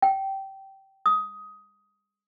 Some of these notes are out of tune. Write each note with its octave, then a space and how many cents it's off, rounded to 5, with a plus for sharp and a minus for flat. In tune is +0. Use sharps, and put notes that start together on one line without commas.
G5 -20
D#6 +15